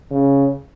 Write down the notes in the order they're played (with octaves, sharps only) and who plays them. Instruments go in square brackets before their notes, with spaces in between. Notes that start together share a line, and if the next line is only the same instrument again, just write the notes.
[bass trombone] C#3